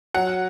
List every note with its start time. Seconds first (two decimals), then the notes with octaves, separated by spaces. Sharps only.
0.14 F#3 F#5